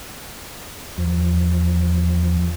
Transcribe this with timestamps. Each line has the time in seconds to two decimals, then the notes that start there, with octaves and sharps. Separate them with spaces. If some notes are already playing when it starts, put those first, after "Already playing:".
0.98 E2 F3